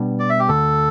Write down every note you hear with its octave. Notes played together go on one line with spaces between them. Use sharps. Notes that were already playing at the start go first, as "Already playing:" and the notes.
Already playing: B2 G3 B3 D4
D5
E5
G4
D2 D3 A3 A4